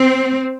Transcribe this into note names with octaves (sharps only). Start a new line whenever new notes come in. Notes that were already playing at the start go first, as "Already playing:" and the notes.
Already playing: C4